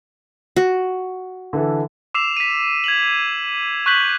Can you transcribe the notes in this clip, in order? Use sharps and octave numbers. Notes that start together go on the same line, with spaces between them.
F#4
D3 E3 A4
D6 E6 C7 E7 F7
B6 D#7
G#6 F7 F#7
C#6 F#6 G6 B6 F#7